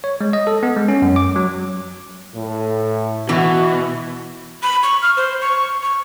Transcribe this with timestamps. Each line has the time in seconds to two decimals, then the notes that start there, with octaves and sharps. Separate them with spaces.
0.04 C#5
0.21 G#3
0.33 D#5
0.47 A4
0.63 B3
0.76 G#3
0.88 C#4
1.02 F#2
1.16 D6
1.36 F#3
2.36 A2
3.29 B2 E3 F#4
4.63 B5
4.83 C#6
5.02 F6
5.17 C5
5.41 C#6
5.83 C#6